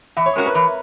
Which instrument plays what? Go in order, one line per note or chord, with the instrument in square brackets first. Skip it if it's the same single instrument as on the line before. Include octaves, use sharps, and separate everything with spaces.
[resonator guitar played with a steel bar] E3 [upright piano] E5
[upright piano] C#5
[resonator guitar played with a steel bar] G#3 C#4 F#4 [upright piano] A#4
[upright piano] B4
[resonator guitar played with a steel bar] E3